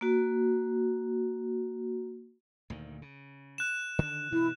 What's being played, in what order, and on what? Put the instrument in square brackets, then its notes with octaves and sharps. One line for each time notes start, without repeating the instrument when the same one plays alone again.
[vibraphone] A#3 F#4
[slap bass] D2 A#2 D#3
C#3
[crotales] F#6 E7
[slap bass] D3 D#3 D4
[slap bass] G2 B2 E3 [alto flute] E4